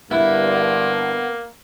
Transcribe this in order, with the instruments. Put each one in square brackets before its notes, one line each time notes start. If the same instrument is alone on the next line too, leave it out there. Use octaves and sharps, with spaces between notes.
[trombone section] G2 D3 [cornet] A#3 [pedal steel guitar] B3 [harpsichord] E4